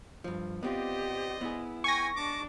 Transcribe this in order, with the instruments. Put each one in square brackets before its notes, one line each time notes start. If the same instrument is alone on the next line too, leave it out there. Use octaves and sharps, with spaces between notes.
[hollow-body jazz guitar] G2 F3
[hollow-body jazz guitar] B3 C4 F4 [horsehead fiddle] G4 [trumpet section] C5 D5 D#5
[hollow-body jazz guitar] B3 G#4 [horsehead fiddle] E4
[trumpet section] G5 G#5 [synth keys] C#6 A#6
[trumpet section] G#3 A5 D6 [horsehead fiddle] D4